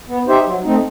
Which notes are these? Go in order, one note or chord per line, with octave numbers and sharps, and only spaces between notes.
B3
D#4 G4 C5 E5
F#3
A3 C4 D#4